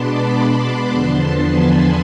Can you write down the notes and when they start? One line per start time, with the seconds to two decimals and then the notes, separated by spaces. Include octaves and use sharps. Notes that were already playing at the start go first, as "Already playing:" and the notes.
Already playing: B2 G#3 B3 D4 A5 B5 C6 D6
0.88 E2 D3 F3 B3 D4 A5 C6
1.41 G#5 B5